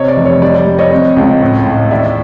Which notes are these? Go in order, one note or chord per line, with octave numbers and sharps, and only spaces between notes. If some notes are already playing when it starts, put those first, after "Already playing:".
Already playing: C3 C#5 D#5
D5
F1
C#5
G3 D5
D5
G3
C#5 D#5
C4
C#2
A2
A2
D#2 D5 E5